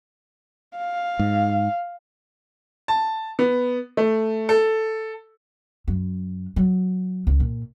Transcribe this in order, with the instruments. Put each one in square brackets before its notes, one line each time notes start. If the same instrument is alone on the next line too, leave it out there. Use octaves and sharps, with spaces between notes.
[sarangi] F5
[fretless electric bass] G#2
[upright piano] A5
B3
A3
A4
[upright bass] F#2
F#3
C#2
A#2